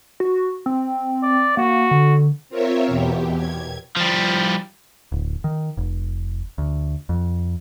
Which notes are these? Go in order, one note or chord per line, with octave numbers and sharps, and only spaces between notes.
F#4
C4
D5
A#3 F#4
D3
C4 F4 A#4 C#5 E5
E2 B2 G4
G#6
F3 G3
D1
D#3
F1
D2
F2